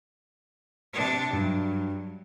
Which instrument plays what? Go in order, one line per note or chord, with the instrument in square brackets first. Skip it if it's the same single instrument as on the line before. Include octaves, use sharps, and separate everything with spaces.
[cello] C3 D4
[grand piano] G2 [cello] F#3